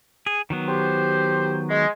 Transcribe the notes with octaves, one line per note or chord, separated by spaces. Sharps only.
G#4
D#3 F#3 B3
G4 C5
G#3